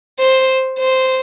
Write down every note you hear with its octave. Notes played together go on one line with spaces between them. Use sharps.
C5
C5